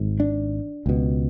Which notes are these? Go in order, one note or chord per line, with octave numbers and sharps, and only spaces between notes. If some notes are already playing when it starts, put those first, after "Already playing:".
Already playing: G#1 G#2
D4
C#2 B2